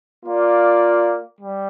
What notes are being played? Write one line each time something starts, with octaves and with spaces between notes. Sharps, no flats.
A#3 F4 D5
G3